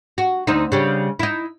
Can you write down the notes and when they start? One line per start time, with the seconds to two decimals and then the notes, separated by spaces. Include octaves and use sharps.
0.18 F#4
0.47 D2 C4 D#4
0.72 C#3 G3
1.19 D#4 E4